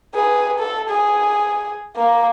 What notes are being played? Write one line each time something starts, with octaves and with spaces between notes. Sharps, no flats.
G#4 B4
A4
G#4
A#3